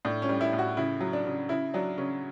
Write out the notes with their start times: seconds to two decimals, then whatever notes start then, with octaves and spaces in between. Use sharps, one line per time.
0.05 A2 D4
0.22 C#4
0.29 G3
0.41 E4
0.53 A2
0.59 F#4
0.77 C#3 E4
1.00 F#3
1.13 D4
1.26 C#3
1.49 C#3 E4
1.74 F#3 D4
1.97 C#3 C#4